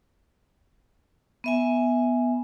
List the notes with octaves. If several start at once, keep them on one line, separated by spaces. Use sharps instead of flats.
B3 E5 G#5